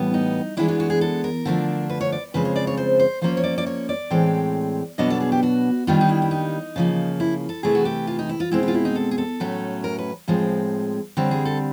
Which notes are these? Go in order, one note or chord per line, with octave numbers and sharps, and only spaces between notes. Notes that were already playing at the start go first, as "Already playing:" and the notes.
Already playing: A2 E3 G3 B3
D#4
E3 G#3 B3 D4 E4
F#4
F#4
G#4
A4
A#4
D3 F3 A3 D4
B4
C#5
D5
C#3 F3 G#3 C4 B4
C#5
D5
C#5
C5
C5
F3 A#3 C#4 C5
C#5
D5
D5
C#5
D5
A2 E3 G#3 C4
B2 F#3 B3 D4 D#5
A4
G#4
G4
F#4
D#3 G3 A#3 D4 F4
D#4
E4
E4
D#4
C#3 F3 A#3
E4
A4
C3 E3 A3 G#4
F#4
G4
F4
D#4
E4
F4
B2 G#3 C4 E4
E4
F4
E4
D#4
A4
G#4
A4
A2 F#3 A3 C#4
A#4
B4
A2 F3 G#3 C4
D3 G3 C4 C#5
G#4
A4